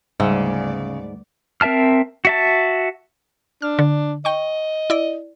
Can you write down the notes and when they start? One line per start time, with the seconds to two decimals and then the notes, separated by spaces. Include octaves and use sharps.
0.20 D2 G#2 C#3 G3 B3 D5
1.61 C4 A#4 E5 A5 F6
2.25 F#4 E5 A5
3.62 D4 F6
3.79 D3
4.25 D#5 G5 C#6
4.90 E4 D5